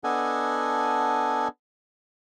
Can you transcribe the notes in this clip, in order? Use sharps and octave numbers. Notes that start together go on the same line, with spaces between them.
B3 D4 A4 D#5 F#5 G#5